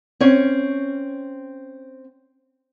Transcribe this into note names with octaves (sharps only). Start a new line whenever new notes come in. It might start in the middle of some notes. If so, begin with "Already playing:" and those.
C4 C#4 C#5